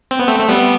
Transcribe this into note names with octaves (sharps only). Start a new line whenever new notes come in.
C4
B3
A3 C4
A3
G3 B3